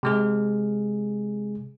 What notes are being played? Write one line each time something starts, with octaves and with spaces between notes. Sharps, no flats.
C3 G#3 G#4